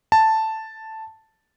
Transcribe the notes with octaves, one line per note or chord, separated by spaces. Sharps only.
A5